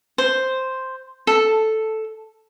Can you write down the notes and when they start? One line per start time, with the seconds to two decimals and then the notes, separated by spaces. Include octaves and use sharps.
0.18 C5
1.27 A4